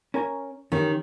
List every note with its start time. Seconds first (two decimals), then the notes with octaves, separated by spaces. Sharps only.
0.14 C#4 A#4 G#5
0.72 D#3 E3 C#4 G4